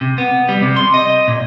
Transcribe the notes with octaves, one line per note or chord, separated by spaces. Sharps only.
C3
B3
G3
C3
C6
D#5
A#2